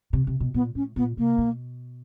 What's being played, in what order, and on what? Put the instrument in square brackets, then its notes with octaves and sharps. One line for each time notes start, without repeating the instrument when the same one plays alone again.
[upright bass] C3
C3
B2
[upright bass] A#2 [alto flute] B3
[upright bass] A2 [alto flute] C#4
[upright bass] A#2 [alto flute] B3
[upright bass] C3 [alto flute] A#3
[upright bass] B2